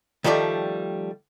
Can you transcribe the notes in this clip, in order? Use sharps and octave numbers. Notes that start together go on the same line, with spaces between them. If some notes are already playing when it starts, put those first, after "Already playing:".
D#3 F3 G3 A3 D5